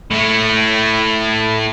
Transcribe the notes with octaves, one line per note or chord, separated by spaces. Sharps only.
A2 A3